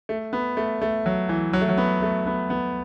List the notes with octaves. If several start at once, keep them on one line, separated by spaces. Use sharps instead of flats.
A3
B3
A3
A3
F#3
E3
F#3
A3
F#3
B3
A3
B3
B3